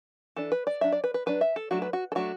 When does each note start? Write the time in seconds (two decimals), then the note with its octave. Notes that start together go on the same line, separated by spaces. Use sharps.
0.36 E3 D4 A4
0.52 B4
0.67 D5
0.81 F#3 D4 E5
0.92 D5
1.04 B4
1.14 B4
1.26 F#3 D4 B4
1.41 E5
1.56 A4
1.71 F#3 A3 D4 F#4
1.82 B4
1.93 F#4
2.12 A4
2.15 F#3 A3 D4 F#4